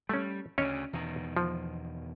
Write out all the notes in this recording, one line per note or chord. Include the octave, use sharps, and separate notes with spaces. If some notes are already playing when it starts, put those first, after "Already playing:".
G3 A3 C#4
D2 C#3 C#4 C#5 D#5
E2 B2 D#3
F3